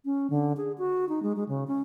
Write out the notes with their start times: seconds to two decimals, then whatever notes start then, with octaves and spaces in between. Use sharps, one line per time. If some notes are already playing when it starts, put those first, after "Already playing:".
0.05 C#4
0.30 D3
0.57 G#4
0.78 F#4
1.09 D#4
1.23 G#3
1.36 G#3
1.49 C#3
1.67 C#4